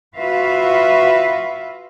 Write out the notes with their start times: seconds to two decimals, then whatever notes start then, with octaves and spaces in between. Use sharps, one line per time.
0.18 F4 F#4 B4 E5 F5